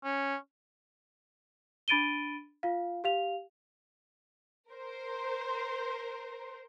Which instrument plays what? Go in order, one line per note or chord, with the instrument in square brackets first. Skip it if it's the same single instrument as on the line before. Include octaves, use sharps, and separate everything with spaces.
[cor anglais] C#4
[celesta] D4 B5 A6 D7 D#7 G7
F4 F5
G4 F5 F7
[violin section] A#4 C5